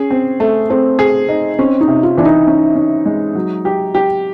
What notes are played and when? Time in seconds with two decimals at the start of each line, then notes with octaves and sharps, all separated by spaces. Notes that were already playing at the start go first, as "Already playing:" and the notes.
Already playing: C#4 G#4
0.10 C4
0.40 A3
0.70 A3 C4
0.99 G#4
1.29 D#4
1.59 C4 C#4
1.81 D#4
1.88 C3
2.03 F4
2.17 E3 D4
2.25 D#4
2.47 C#4
2.76 C#4
3.06 G#3
3.35 F#3
3.65 G4
3.95 G4